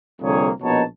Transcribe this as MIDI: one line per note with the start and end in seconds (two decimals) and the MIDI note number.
0.21 0.49 36
0.21 0.49 41
0.21 0.49 50
0.21 0.49 58
0.21 0.49 68
0.21 0.49 73
0.62 0.82 34
0.62 0.82 47
0.62 0.82 59
0.62 0.82 63
0.62 0.82 73
0.62 0.82 81